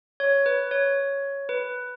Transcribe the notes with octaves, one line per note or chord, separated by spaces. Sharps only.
C#5
B4
C#5
B4